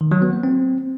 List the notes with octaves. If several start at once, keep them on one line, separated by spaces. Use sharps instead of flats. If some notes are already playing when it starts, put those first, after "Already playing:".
D#3
F#3
B3
A#3
C4